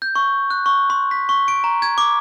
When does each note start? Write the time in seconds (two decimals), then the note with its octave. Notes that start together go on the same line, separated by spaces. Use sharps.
0.02 G6
0.16 C#6
0.51 F#6
0.66 C#6
0.90 C6
1.11 B6
1.29 C#6
1.48 D7
1.64 A#5
1.82 G#6
1.98 D6